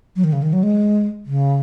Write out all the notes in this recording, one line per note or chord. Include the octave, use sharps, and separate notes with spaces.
F#3
D#3
C#3
D#3
F#3
G#3
C#3